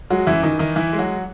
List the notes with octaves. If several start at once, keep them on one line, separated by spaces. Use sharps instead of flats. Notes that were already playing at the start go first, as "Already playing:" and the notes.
F#3 G#3 F#4
F#2 E3 E4
D#3 E3 D#4
D#3 E3 D#4
E3 E4
G#3
F#3 F#4